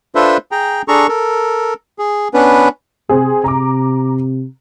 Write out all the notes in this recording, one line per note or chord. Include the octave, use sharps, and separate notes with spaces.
D4 F4 A4 B4 C5 E5
G#4 G5 A#5
D4 G#4 A4 A#5 C#6
A4 A#4
G#4
B3 C#4 D4 B4
C3 C4 G#4
C3 A#5 D6